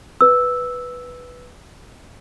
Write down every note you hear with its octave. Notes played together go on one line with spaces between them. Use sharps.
B4 E6